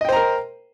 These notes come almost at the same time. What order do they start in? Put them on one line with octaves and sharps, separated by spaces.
D#5 G5 C5 A#5 A#4